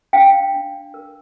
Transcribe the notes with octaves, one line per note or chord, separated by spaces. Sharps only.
D4 F5 G5
D4
A#4